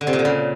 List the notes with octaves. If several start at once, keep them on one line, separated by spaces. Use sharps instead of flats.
D3
C3
A#2
D3
C#3